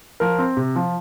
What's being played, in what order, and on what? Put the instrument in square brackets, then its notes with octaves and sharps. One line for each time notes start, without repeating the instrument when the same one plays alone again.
[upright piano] F3 A#4
C4
C3
F3